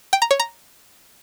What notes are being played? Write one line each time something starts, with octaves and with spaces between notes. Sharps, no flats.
G5
A#5
C#5
A#5